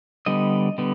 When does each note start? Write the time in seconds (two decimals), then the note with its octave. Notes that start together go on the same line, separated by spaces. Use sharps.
0.26 D3 G3 B3 D#5
0.78 D3 G3 B3